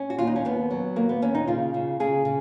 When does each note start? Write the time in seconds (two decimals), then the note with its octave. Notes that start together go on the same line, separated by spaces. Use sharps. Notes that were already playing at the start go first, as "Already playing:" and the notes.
Already playing: C#4
0.10 F#4
0.18 D#2 F4
0.27 D#4
0.36 C#4
0.45 D#2 B3
0.71 F#3
0.96 D#2 A#3
1.09 B3
1.22 D#2 C#4
1.35 D#4
1.47 C#3 F4
1.74 C#3
2.00 C#3 G#4
2.25 C#3